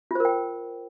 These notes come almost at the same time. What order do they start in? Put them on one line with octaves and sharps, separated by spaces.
F4 C5 A#4 G5